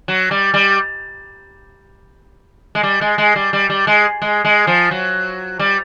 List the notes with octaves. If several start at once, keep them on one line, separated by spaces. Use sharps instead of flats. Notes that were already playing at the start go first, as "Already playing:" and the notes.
F#3
G3
G3
G#3
G3
G#3
G#3
G3
G3
G3
G#3
G#3
G#3
F3
F#3
G3